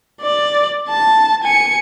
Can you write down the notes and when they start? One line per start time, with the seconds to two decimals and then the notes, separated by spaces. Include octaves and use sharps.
0.22 D5
0.89 A5
1.44 G#5 C#7